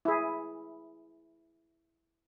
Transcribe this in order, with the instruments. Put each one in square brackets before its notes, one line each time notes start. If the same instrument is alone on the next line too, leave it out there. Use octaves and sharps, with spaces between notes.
[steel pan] E4 G#4